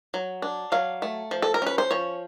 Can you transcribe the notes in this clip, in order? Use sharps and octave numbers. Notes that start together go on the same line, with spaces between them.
F#3
D4
F#3 F5
A3
F3
A4
A#4
C#4 B4
C5
F3 C#5